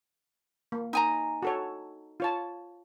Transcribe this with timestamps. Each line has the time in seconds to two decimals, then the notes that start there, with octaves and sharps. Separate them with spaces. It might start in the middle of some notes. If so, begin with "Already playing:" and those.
0.72 A#3
0.93 D#4 G#5 A#5
1.42 F#4 A4 C#5
2.20 F4 C#5 A5